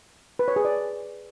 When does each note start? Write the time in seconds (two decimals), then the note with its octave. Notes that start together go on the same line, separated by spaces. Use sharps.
0.39 B4
0.48 C#5
0.56 G#4
0.65 D5